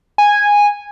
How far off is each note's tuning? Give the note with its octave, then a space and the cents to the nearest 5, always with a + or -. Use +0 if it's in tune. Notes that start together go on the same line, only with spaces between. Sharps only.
G#5 -10